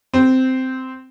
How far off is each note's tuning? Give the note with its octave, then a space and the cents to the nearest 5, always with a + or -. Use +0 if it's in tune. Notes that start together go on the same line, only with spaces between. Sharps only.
C4 -10